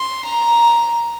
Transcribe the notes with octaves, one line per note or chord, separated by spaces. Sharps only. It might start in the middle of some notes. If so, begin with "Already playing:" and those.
Already playing: C6
A#5